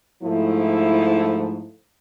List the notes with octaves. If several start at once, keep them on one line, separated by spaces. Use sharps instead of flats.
G#2 F3 A3 E4